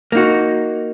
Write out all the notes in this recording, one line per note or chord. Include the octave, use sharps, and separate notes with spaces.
A#3 D#4 F#4